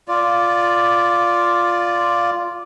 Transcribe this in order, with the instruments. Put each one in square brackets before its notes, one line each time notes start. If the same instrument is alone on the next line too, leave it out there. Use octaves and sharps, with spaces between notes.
[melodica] F4 D5